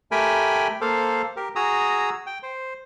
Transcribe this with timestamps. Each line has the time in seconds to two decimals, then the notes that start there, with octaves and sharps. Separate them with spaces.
0.11 A3 G4 A#4 G5 G#5 B5
0.81 A#3 A4 C5 F5
1.37 G4 A#4
1.56 F#4 G#4 A#5 D#6 E6
2.26 G5
2.43 C5